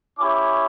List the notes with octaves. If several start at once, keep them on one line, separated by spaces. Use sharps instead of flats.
C#4 E4 G4 D6